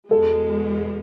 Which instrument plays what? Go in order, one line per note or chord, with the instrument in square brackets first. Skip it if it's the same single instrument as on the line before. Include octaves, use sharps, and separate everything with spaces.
[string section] E2 B2 G#3 [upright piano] A4